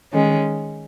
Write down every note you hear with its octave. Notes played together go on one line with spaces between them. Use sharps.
D#3 G#3 C#4